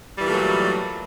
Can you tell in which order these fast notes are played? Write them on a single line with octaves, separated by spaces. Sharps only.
G3 E3 A#2 A3 F#3